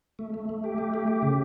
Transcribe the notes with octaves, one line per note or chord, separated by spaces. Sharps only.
A3
A3
A3
G4
A3
G4
G4
C#3